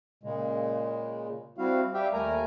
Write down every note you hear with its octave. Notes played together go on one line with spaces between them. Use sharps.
A#2 C#3 G#3
G3 C4 E4 F#4 F5
G3 G4 E5 F5 G5
D#2 G3 A3 A#4 G#5 A#5